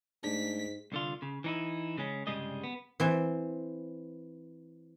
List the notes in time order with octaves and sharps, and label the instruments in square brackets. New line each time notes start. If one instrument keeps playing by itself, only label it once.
[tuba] G#2 [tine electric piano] A3 D4 [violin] B6
[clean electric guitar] C2 D3 F4
C#3
E3 D#4 E4
C#3 G#3 C#4
C2 G2 C#3 G3 G#3 D#5
B3
[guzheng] E3 C4